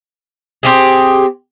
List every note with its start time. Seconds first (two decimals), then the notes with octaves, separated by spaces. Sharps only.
0.63 C4 G4 G#4